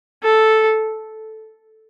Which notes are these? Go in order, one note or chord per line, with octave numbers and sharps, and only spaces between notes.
A4